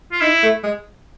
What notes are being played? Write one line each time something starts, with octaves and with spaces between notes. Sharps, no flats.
F4
D#4 E4
A3
G#3